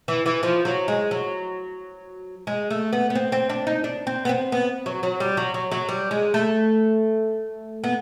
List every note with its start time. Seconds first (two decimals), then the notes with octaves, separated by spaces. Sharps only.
0.08 E3
0.26 E3
0.43 F3
0.65 F#3
0.88 G#3
1.11 F#3
2.47 G#3
2.71 A3
2.93 B3
3.10 B3
3.15 C4
3.32 C4
3.50 D4
3.67 D#4
3.84 D4
4.07 C4
4.25 B3
4.29 C4
4.52 B3
4.86 F#3
5.03 F#3
5.20 G3
5.37 F#3
5.54 F#3
5.71 F#3
5.89 G3
6.11 G#3
6.34 A3
7.84 B3